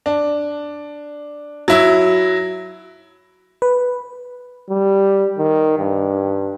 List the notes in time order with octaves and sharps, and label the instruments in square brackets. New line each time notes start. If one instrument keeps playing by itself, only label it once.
[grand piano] D4
F#3 E4
[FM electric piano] B4
[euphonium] G3
D#3
G2